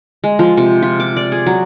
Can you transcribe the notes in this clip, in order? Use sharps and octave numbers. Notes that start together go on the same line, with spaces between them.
G#3
F3
C3
F4
D6
D5
G#4
F#3